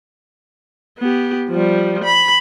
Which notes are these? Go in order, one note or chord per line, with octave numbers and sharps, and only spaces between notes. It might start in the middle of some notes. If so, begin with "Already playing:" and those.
B3 G4
F3 G3
B5